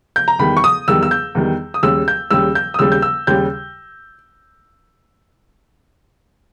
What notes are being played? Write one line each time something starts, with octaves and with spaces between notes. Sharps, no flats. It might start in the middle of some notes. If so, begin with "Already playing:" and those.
G6
A#5
E2 D#3 G3 B5
C#6
D#6
E2 D#3 G3 E6
E6
G6
E2 D#3 G3
D#6
D#2 C#3 G3 E6
G6
D#2 C#3 G3 E6
G6
D#6
D#2 C#3 G3 E6
G6
E6
D#2 C#3 G3 G6